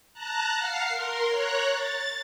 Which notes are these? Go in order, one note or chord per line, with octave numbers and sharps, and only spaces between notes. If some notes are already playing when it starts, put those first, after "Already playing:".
A5 A#5 F#6
F5 F#5 F6 C7
A#4 C6
C#5 A#5 F#6
A6